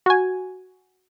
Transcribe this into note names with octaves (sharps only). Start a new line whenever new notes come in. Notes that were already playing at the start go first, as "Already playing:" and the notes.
F#4 G#5